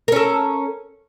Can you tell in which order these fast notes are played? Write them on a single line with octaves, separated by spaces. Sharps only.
A#4 C#4 A4